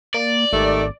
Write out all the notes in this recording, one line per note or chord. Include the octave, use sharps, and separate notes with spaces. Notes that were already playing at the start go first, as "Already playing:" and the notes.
A#3 D5
G#1 D#3 G3 A3